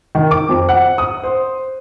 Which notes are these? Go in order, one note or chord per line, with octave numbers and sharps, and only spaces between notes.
D#3
D6
F2
F#5
D#6
C5